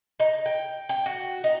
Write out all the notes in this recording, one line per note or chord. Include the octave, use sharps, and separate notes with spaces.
D#4
G5
G5
F#4
D#4